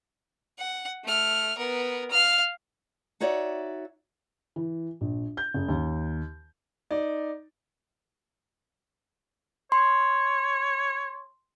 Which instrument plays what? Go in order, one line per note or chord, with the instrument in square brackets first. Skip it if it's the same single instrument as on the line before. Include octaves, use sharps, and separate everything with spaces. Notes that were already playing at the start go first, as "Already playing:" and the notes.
[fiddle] F#5
A3 F6
B3 A#4
F5 F6
[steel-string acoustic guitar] D#4 F#4 C#5 D5 E5
[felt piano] E3
A#1
G6
F#1
D#2
[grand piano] D#4 D5
[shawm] C#5 [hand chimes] C6